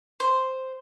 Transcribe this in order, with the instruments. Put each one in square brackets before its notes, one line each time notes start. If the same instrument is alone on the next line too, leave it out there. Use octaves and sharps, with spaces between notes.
[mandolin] C5